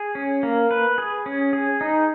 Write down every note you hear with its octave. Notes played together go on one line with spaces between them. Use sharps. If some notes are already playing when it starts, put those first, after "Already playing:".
Already playing: G#4
C#4
A#3
B4
G#4
C#4
G#4
D#4